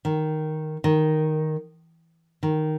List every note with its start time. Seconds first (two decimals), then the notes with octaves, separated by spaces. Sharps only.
0.05 D#3
0.84 D#3
2.43 D#3